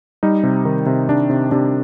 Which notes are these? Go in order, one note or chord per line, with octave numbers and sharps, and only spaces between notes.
G3 D#4
C3
D#3
C3
C3 D4
C3
C3 D4